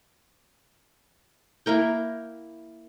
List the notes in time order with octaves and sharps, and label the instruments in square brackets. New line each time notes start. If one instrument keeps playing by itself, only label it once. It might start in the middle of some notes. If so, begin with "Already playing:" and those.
[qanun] A#3 E4 A#4 G5